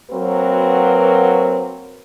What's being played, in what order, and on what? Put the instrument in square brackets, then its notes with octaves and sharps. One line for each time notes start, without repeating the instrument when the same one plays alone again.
[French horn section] F#3 A#3 C4 F#4 A#4 B4